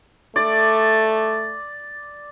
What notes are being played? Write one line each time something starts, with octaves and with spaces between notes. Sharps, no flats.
A3 D5